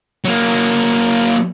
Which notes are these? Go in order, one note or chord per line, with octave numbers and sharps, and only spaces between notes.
F#3 A#3